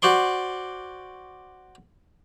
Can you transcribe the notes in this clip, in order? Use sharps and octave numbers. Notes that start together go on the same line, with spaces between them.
F#4 C5 D5 C6